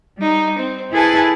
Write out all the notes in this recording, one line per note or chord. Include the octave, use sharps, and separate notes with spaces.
G3 D#4
C4
E4 G#4 A4 B4 G#5 A5